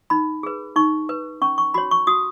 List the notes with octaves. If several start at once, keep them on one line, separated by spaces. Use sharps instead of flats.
D#4 B5
G#4 B4
D#4 C#6
B4
C#4 C#6
C#6
F#4 C#5 B5
C#6
F#4 D#6